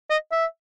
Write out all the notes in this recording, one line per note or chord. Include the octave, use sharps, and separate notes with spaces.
D#5
E5